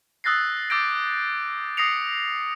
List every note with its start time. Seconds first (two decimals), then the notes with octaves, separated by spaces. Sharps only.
0.24 D#6 E6 F#6 A6 A#6 C7
0.70 D6 E6 G6 A6 A#6 D7
1.77 D#6 A#6 C7 C#7 F7